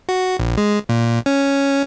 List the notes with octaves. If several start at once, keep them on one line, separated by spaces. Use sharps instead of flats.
F#4
A#1
G#3
A#2
C#4